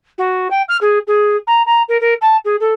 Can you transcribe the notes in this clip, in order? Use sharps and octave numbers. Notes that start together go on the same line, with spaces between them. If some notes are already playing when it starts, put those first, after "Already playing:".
F#4
G5
F6
G#4
G#4
A#5
A#5
A#4
A#4
A5
G#4
A4